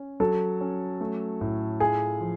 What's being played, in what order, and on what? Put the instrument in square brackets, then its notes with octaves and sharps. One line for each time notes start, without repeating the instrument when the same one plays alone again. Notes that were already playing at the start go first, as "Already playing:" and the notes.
Already playing: [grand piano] C#4
[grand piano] F#3 [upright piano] A4
[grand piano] C#4
A3
A2
[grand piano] F4 [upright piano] G#4
[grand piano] F3